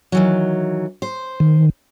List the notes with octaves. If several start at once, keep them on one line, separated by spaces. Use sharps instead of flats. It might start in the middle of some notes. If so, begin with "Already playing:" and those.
D#3 E3 F#3
C5
D#3